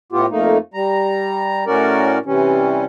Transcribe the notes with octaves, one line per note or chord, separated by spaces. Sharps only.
A2 B3 F4 G4
F2 A3 A#3 D#4
G3 A#5
A2 C#4 F#4 A#4 D5
C3 E3 G3 C#4